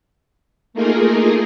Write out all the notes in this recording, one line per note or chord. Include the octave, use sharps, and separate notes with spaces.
A3 A#3 D#4 F4 G#4 A#4